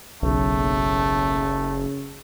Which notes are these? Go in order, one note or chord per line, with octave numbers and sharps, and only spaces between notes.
F#1 B1 C#3 A3